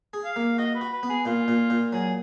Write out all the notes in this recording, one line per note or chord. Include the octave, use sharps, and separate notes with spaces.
G#4
F5
A#3
F#4 D#5
B4
F#4
B4
B3
G#4
A#2 F4
A#2
A#2
F#3 G#4